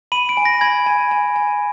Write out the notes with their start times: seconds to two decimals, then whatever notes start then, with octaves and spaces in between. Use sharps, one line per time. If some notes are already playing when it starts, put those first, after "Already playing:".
0.12 B5 D#7
0.29 D7
0.37 G#5
0.45 A#6
0.61 B5 G#6
0.86 G#5
1.11 G#5
1.36 G#5